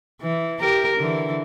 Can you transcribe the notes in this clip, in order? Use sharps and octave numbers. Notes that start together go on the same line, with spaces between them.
E3
G4 A#4
D3 E3